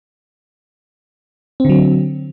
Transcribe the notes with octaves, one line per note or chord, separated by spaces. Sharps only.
D3 F#3 C4